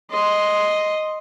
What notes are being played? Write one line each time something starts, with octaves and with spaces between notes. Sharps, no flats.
D#5 C6